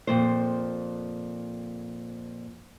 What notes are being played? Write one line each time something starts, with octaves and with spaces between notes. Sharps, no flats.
F2 A#2 C5